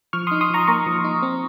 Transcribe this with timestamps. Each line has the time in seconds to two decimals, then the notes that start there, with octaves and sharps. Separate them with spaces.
0.13 F3 C#6 F6
0.27 D#4 C6 D#6
0.41 C6 D#6
0.50 F3 A#5 C#6
0.67 A#3 A#5 C#6
0.86 F3
1.04 D#4
1.22 C4